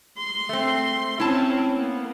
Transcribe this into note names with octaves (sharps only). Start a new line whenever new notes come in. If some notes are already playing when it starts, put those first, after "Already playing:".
C6
A3 C4
C4 C#4 E4 A5
A#3 B3